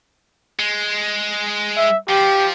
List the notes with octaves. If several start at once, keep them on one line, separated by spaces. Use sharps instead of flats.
G#3
E5
F3 G4